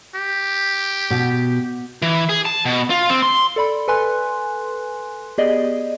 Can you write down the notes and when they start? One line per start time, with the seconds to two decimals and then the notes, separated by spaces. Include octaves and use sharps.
0.15 G4
1.10 B2
2.02 E3
2.29 G#4
2.45 A5
2.65 B2
2.90 F4
3.10 C4
3.22 C6
3.56 A4 D5 B5
3.88 A4 B4 G#5 C6 F#6
5.38 B3 G4 G#4 D5 D#5